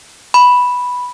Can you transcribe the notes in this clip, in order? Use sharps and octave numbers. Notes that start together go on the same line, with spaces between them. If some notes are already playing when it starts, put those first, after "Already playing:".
B5